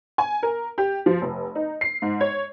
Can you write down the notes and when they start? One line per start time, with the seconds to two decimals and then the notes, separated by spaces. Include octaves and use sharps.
0.18 G#5
0.43 A#4
0.78 G4
1.06 F3
1.22 F1
1.55 D#4
1.81 C7
2.02 G#2
2.21 C#5